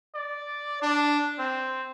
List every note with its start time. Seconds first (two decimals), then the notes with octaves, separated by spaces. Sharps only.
0.15 D5
0.82 D4
1.39 C4